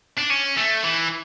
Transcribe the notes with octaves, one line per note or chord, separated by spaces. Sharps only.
D4
C#4
A3
E3